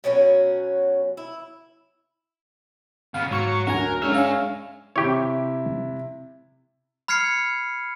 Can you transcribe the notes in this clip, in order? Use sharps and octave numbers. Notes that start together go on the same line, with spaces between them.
B2 F#3 C#4 F#4
E4
C#3 B3 F5
G#2 F#3 C#6 C#7
D2 F#3 A#4 F#5 G#5
G#3 C#4 D4 C#5 E5 F6
F5 G#5
C3 E4 G4 C#5
B5 F6 G#6 C7 C#7